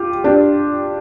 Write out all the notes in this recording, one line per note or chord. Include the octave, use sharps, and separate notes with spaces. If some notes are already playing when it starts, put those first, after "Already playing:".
Already playing: F4 G4
D4 G4